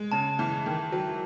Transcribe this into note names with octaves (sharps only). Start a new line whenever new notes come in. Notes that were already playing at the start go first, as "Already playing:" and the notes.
Already playing: G#3
C#3 A5
E3
D#3
F#3